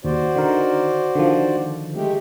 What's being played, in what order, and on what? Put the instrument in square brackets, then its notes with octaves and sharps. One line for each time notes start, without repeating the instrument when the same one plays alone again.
[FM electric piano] D#2 [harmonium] F#4 C5 D5
[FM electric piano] D3 D#3 A#4
D3 D#3 F3
[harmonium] G#3 A3 G4